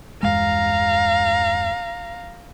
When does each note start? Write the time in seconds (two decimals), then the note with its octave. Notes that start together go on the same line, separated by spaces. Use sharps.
0.23 E2 G2 G#3 F5 A#5